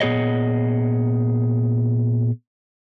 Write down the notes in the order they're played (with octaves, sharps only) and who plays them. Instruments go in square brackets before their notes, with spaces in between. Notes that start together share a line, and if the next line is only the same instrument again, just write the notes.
[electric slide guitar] A#2 B3 G#4 C#5 D#5